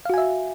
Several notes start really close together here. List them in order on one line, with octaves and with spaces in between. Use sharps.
F5 F#4 G#5 E5